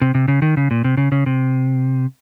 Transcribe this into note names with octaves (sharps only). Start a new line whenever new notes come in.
C3
C3
C#3
D#3
C#3
A#2
C3
C#3
C#3
C3